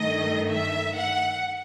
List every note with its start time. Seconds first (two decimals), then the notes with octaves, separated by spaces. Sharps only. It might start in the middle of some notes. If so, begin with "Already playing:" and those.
Already playing: G2 D#3 A3 D#5
0.49 E5
0.96 F#5